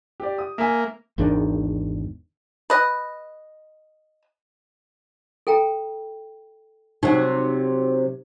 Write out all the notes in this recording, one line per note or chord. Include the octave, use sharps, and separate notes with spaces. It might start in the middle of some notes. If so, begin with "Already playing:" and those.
G4 D5
D#6
A#3 E5 G#5
G#1 E2 D#3 D4
B4 D#5
A4 G5 A#5
C3 F#3 D#4 G4